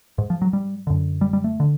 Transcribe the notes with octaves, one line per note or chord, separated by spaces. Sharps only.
G#2
F3
F#3
G3
F#2 D3
G3
G3
A3
D3